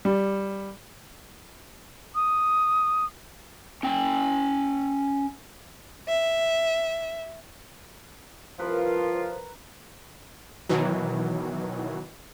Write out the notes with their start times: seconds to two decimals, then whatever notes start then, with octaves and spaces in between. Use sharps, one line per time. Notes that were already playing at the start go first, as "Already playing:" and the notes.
0.05 G3
2.15 D#6
3.83 C#4 G5
6.08 E5
8.59 C2 F3 F4 A#4 B4
10.69 B2 D#3 E3 F#3